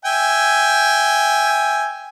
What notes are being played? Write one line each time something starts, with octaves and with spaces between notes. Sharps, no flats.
E5 G5 G#5